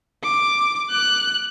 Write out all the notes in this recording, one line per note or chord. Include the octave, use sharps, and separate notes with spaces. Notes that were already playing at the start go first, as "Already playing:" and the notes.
D6
F#6